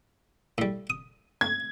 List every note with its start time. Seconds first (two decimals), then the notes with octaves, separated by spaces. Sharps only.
0.58 A2 G3
0.90 D#6
1.41 G#6